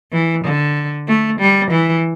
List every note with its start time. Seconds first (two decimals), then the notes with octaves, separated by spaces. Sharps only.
0.12 E3
0.44 D3
1.07 A3
1.40 G3
1.71 E3